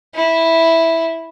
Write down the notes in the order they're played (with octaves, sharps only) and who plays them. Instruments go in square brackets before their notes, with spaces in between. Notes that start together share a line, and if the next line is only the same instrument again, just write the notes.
[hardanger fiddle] E4